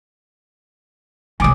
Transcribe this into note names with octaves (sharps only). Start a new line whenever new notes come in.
B1 D#3 G#5 D6 D#6